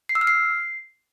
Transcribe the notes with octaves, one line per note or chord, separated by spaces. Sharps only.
C7
E6
F6
C7